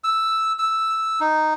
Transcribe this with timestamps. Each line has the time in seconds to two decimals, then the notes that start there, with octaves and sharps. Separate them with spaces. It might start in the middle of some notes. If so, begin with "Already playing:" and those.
0.04 E6
0.59 E6
1.20 D#4